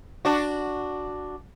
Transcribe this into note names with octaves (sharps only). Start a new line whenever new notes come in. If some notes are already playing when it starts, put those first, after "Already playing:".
D4 F#4